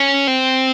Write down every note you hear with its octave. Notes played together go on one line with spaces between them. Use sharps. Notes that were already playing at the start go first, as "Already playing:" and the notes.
Already playing: C#4
C4